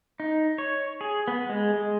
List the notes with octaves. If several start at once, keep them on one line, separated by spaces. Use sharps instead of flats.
D#4
C#5
G#4
B3
G#3
G#3